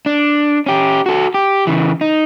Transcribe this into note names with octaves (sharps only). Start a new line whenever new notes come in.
D4
C#4 G4
F#4 A4
G4
C#3 E3
D#4